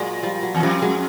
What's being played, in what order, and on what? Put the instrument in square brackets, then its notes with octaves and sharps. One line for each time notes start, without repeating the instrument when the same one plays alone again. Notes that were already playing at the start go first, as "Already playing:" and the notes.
Already playing: [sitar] A#2 [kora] F#3 G#3
[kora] F3 G3
F#3
[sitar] E2
[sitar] F2 [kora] F3 G3
[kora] F#3 G#3